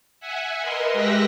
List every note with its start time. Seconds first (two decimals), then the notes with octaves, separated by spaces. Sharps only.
0.20 E5 F#5 G#5
0.60 A#4 B4 D#5 C6
0.93 G#3 G4 E5 E6 F#6 A#6